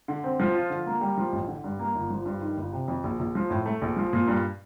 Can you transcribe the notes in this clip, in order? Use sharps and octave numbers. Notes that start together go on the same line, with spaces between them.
D3
C4
F3
F4
D3
A#3
G3
F3
A1
D3
G2
A#3
G1
F3
G2
D#3
G1
C3
F2
A#1
A#1
F3
A2
A3
A#1
F3
A#2
G2